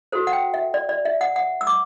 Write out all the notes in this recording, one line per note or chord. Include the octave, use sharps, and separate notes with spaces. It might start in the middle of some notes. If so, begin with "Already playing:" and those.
F#4 A4 C5
F#5
G5
E5
D5
D5
E5
F#5
F#5
E6
D6